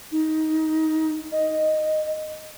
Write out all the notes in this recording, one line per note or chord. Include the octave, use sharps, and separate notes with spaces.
D#4
D#5